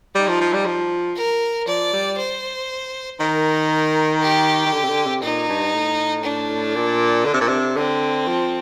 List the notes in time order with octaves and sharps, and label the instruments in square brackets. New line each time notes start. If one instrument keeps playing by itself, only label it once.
[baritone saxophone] G3 [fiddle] D#4
[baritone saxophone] F3
F3
G3
F3
[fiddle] A#4
[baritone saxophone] F3 [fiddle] D5
[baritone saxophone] G3
[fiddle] C5
[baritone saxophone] D#3 [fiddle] A#4
[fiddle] G4
[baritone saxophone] D#3
D3
C3
D3
C3
[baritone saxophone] A#2 [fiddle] D#4
[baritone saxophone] G2
A2
[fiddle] D4
[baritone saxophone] A#2
D3
C3
A#2
C3
[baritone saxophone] D3 [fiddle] C4
[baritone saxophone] F3